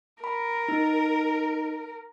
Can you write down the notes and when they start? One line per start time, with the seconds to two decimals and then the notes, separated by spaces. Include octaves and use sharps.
0.24 A#4 B5
0.68 D#4